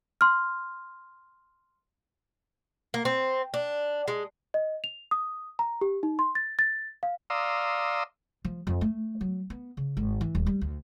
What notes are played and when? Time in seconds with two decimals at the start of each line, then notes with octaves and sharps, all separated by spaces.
0.21 C6 F6
2.94 A#3
3.05 C4
3.54 D4
4.08 G#3
4.54 D#5
4.84 F7
5.11 D#6
5.59 A#5
5.81 G4
6.03 D#4
6.19 C6
6.35 A6
6.59 A6
7.03 F5
7.30 D5 F5 A#5 C6 D#6 E6
8.45 F3
8.67 F2
8.81 A3
9.21 F#3
9.50 B3
9.77 C#3
9.97 G#1
10.21 E3
10.35 D#1
10.47 G3
10.61 D2